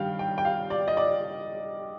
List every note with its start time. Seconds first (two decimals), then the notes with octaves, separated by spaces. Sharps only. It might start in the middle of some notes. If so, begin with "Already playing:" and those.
Already playing: G2 D#3 G3 F5 G5
0.19 G5
0.38 G5
0.45 F5
0.70 D5
0.88 D#5
0.97 D5